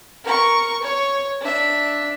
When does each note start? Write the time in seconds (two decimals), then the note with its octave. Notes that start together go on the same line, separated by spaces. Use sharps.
0.24 A#4 C#6
0.82 C#5
1.41 D4 E5